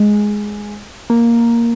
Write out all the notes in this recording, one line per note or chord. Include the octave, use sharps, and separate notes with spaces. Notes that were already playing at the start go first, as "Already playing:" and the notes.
Already playing: G#3
A#3